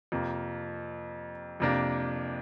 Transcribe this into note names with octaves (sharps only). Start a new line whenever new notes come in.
F2 C3 A#3
F2 C3 A#3 D4